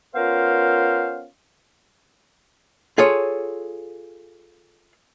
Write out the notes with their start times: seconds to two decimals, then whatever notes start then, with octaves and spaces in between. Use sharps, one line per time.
0.15 B3 C#4 F4 A#4 C5 F5
2.98 F4 G#4 A4 C#5